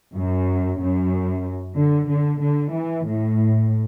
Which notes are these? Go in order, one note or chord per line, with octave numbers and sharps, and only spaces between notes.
F#2
F#2
D3
D3
D3
E3
A2